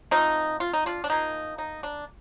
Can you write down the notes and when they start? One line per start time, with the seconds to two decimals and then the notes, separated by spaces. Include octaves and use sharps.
0.11 F3 A3 C4 D#4
0.60 F4
0.73 D#4
0.86 D4 F4
1.04 D4
1.10 F3 A#3 D#4
1.58 D#4
1.83 D4